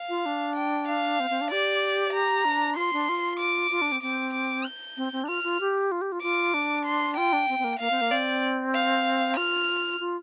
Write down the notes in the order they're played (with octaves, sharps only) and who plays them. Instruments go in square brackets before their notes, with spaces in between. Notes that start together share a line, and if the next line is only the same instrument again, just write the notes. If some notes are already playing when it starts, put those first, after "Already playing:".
Already playing: [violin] F5
[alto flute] F4
D4
[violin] G5
F5
[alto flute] C4
C4
D4
[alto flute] G4 [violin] D5
[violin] A#5
[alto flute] D4
[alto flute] F4 [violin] C6
[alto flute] D4
F4
[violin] D6
[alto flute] F4
D4
C4
[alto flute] C4 [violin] D6
[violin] D6
G6
[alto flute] C4
C4
D4
[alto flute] F4 [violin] F6
[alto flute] F4
G4
F4
G4
F4
[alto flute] F4 [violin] D6
[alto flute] D4
[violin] C6
[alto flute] F4 [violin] G5
[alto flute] D4
C4
C4
A#3
[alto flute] A#3 [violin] F5
[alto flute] C4
A#3
[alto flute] C4 [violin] D5
[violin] F5
[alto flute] F4 [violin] F6
[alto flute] F4